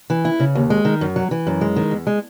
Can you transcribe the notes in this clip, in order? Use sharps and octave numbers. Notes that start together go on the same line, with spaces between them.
E3
E4
C#3
D#2
G#3
D#3
F#2
F#3
E3
F#2
G#3
D#3
E2
G#3